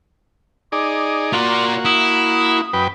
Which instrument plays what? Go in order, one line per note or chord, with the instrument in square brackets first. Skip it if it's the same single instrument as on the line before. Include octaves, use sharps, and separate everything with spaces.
[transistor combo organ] D#4 G#4 D5 [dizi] D6
[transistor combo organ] A#3 F#4 [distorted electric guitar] F4 D5 [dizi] C6
[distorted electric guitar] E4 [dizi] D#6
[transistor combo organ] F#2 B4 G5